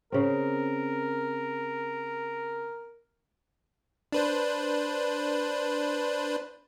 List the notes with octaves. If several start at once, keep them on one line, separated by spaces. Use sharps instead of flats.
C#3 C4 A#4
D4 B4 C5